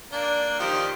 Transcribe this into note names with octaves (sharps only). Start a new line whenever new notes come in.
A#3 D4
D#3 F3 G4